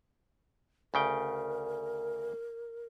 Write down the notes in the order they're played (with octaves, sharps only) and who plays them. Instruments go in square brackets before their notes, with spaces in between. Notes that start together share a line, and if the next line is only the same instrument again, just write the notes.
[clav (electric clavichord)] D2 C#3 G5 [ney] A#4